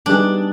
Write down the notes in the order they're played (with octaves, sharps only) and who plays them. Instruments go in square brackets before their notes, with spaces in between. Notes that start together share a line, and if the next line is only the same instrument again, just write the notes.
[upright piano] G3 B3 D#4 G#4 [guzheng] D4